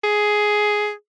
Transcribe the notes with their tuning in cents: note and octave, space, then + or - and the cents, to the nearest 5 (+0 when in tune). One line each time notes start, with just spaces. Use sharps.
G#4 +10